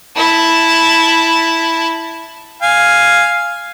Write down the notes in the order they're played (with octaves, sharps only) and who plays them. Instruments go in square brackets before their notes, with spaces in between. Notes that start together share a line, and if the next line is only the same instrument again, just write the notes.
[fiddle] E4 A5
[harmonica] F5 G#5